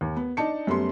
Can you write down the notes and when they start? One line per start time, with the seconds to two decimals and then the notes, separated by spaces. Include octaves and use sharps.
0.01 D#2
0.16 B3
0.37 D4 D#4 A5 C#7
0.67 F#2 G3 A3 B3 C6